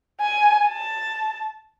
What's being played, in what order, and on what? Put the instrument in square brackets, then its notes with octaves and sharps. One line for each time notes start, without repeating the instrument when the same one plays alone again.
[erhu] G#5
A5